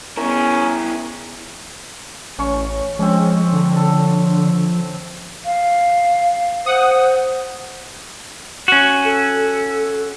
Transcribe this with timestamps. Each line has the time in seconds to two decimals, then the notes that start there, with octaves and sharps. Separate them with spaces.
0.17 B3 C#4 E4 G#4 A#4
2.39 A1 C#4 C#5 C#6
2.99 F3 G#3 C4 C#4
3.53 D3
3.76 A4
5.45 F5
6.66 C5 F#5 D#6
8.68 C#4 F#4
9.05 A4